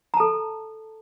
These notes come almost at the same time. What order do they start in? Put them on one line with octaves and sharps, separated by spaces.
A#5 A5 A4